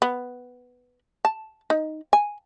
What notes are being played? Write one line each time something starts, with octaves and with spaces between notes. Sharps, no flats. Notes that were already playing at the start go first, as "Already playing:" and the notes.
B3
A5
D#4
G#5